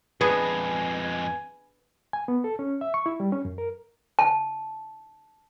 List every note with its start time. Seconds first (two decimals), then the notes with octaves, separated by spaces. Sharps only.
0.21 F2 G#3 B3 D4 G#4 B4 G#5
2.13 G#5
2.28 B3
2.44 A4
2.59 C#4
2.81 E5
2.94 C#6
3.06 E4
3.20 G3
3.32 C#4
3.45 F#2
3.58 A#4
4.19 A5